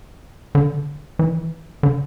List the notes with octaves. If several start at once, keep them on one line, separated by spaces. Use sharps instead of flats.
D3
E3
D3